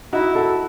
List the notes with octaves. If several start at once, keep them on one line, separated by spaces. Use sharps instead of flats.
D#4 E4 F#4
F#4 A4